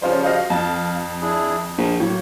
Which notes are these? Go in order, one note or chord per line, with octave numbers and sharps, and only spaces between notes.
C#3 F3 G3 C#4 F4 C5
F#4 D#5 F5
F2 F5 A5
D4 E4 G#4
A#1 D#4
A2 F#3 A#3